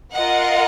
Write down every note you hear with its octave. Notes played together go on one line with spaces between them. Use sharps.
F4 A#4 D#5 F#5